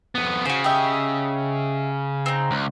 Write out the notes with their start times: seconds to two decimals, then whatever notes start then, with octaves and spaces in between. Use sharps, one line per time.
0.15 F2 B3
0.45 C#3 F#4 C5
0.64 G4 D#5 E5
2.26 C4 D#4
2.51 C#2